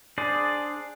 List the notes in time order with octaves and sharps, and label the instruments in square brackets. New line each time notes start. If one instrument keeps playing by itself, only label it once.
[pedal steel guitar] D4 G#4 C5 D5